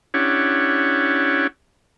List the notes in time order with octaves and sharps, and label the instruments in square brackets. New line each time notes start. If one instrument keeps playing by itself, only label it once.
[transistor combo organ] C#4 D4 E4 G4 C#5 F#5